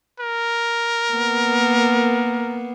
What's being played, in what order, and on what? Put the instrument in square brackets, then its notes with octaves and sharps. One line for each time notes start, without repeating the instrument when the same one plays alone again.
[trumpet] A#4
[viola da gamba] A#3 B3